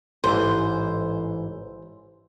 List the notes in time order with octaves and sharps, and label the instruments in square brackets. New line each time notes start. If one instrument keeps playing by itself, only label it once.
[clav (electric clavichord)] A1 G#2 E3 [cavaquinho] C5